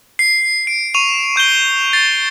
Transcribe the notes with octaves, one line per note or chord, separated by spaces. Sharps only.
C7
D7
C#6 D#7 F7
C#6 G6 D7 G7
A6 C7